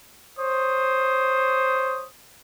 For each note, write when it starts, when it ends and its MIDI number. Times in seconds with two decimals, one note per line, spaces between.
0.37 2.04 72
0.37 2.04 73
0.37 2.04 87